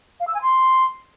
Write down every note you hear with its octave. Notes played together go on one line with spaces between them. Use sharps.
F5
E6
G#5
C6